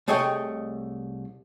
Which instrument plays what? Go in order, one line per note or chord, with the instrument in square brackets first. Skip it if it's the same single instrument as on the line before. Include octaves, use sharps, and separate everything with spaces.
[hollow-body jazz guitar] C2 A3 G#4 C#5 D#5 G5